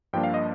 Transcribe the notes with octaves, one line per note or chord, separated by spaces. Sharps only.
G2 F3 A#3 D4 G5
F5
D#5